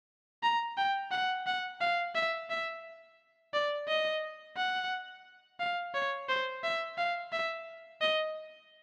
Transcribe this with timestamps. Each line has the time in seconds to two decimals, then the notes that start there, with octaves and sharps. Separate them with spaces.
0.43 A#5
0.77 G5
1.12 F#5
1.47 F#5
1.81 F5
2.15 E5
2.50 E5
3.54 D5
3.88 D#5
4.56 F#5
5.60 F5
5.94 C#5
6.29 C5
6.64 E5
6.98 F5
7.33 E5
8.01 D#5